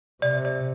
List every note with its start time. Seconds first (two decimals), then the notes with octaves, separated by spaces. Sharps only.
0.22 C3 D5
0.45 D5